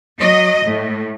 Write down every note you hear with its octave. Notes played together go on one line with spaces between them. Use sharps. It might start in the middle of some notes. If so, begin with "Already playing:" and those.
F#3 D#5
A2